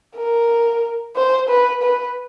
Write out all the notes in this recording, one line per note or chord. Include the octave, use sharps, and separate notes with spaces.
A#4
C5
B4
B4